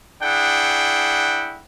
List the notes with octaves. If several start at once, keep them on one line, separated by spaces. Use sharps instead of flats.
D4 E4 G#4 F#5 G5